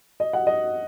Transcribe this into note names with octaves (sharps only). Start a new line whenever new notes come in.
D#5
F#5
D#5